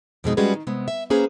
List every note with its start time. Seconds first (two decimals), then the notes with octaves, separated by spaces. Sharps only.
0.24 F2 B2 G#3 D#4
0.37 G3 G#3 C#4 F#4 G#4 B4
0.54 D#3
0.67 C3 G#3 B3
0.88 E5
1.10 A#3 C#4 G#4 B4 C5 A#5